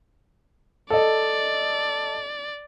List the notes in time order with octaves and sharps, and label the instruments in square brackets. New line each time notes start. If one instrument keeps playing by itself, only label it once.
[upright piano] A4 D#5 [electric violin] D5